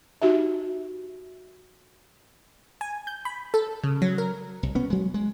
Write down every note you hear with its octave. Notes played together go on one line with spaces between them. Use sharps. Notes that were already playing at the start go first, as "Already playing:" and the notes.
D#4 F#4 G4 E5
G#5
G6
B5
A4
C#3
F#3
A#4
C2
B3 C#4
F#3 G#3
G#3